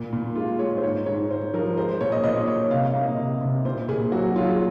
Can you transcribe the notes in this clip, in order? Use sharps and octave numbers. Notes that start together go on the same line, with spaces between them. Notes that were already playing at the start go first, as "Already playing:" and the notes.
Already playing: A#2
A#2
G#3 F4
G#3 C#5
C5
G#2 C#5
G#2 C#5
G#2 C5
F3 A#4
G#3 C5
C5
A#2 C#5
D#5
A#2 D#5
A#2 C#5
C3 F5
F5
A#3
D#5
C3
C3
A#2 C5
A#2 G#4
F#3 F#4
F#3 F4
G#4